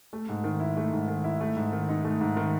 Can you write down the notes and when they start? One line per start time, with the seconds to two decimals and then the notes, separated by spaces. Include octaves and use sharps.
0.13 A3
0.29 G#2
0.44 D#3
0.60 E4
0.77 A3
0.93 G#2
1.08 D#3
1.24 E4
1.41 A3
1.56 G#2
1.73 D#3
1.89 D#4
2.04 A3
2.20 G#2
2.37 D#3